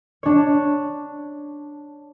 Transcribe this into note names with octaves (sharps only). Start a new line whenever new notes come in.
D4 C#5